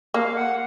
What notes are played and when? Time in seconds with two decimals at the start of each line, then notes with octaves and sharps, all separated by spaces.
0.14 A#3 F5
0.36 F#5